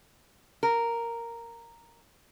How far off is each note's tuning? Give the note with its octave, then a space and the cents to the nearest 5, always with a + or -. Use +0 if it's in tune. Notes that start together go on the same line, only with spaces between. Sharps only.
A#4 -5